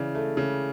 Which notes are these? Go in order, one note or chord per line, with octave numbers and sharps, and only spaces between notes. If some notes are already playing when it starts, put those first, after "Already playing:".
Already playing: C#3 E3 D5
A3
C#3